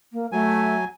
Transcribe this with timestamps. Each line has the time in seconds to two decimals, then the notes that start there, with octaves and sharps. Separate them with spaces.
0.13 A#3
0.32 F#3 A3 G#5